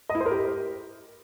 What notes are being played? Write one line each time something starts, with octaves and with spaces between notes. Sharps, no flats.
D#5
E4
C5
A#4
G4